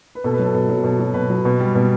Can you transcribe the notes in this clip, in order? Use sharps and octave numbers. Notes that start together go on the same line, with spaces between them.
B4
B2 A4
B4
F#3 A4
B2 A4
F#3
B2
F#3
B2 B4
F#3
B2
G3
B2